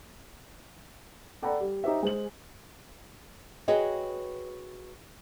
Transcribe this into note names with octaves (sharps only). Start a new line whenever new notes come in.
A4 D5 F#5 G5 A#5 B5
G3
D#4 G4 C5 E5
G#3 C5 F#7
F#4 G#4 B4 C#5 D#5 G5